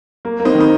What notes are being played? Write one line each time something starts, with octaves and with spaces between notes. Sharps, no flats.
A#3
A#3
C4 D#4
D#3
D#4